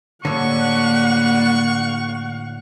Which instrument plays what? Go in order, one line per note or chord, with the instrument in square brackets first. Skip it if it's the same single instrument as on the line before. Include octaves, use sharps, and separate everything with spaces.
[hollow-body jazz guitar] A2 D3 [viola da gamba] G3 A#3 [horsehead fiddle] F#5 [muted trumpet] C#6